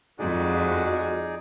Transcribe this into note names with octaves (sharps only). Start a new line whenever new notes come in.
F2 G#3 D#4 F#4 G#4 D5